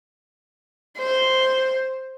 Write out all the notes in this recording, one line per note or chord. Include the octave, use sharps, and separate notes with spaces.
C5